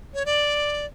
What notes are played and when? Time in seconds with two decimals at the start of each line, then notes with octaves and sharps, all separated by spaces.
0.14 C#5
0.26 D5